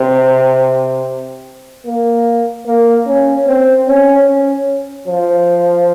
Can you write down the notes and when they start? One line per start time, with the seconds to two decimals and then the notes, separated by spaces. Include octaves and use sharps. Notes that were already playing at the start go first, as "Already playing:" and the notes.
Already playing: C3
1.86 A#3
2.66 A#3
3.06 C#4
3.47 C4
3.88 C#4
4.28 C#4
5.08 F3